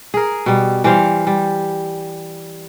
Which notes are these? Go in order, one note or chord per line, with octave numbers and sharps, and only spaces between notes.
G#4 A#4
B2 G3
E3 G3 C5 F5
G3